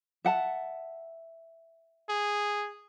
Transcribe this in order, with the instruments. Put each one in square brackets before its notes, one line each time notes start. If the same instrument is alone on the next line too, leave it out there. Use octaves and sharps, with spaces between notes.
[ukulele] E5 F#5 A5
[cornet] G#4